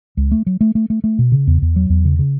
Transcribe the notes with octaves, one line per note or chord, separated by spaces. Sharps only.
C#2
A3
F#3
A3
A3
A3
A3
B2
C#3
E2
E2
F#3
E2
C#3
C#3